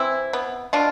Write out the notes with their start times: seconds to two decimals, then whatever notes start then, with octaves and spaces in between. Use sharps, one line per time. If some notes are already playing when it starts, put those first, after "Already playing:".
Already playing: E3 C4 E4
0.33 B3
0.73 B2 D4 F4